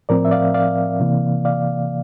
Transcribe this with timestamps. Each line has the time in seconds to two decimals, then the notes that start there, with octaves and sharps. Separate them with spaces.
0.09 A2 F3 C4 A#4 D5
0.25 E5
0.31 D5 F5
0.54 D5 F5
1.00 C3 E3 A#3
1.45 D5 F5